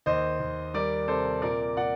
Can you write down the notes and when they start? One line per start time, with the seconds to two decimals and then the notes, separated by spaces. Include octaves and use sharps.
0.06 D#2 C5 D#5
0.40 D#2
0.74 G3 A#4 D5
1.08 C3 A4 C5
1.42 A#2 A#4 D5
1.77 A#2 D5 F#5